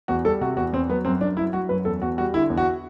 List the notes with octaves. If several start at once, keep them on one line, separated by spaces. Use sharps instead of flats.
E2 F#4
G3 A4
C3 F#4
E2 F#4
E2 C4
F#3 B3
F#2 C4
F#2 D4
F#3 E4
F#3 F#4
F#2 B4
E2 A4
E2 F#4
G3 F#4
D3 E4
E2
F#4